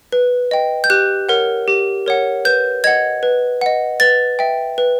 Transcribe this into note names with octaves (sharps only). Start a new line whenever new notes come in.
B4
D#5 G5
G6
G4 F#6
A#4 C#5 F#5
G4
A#4 C#5 F#5
B4 G6
D#5 F#5 G#6
B4
D#5 F#5
B4 A6
E5 G5
B4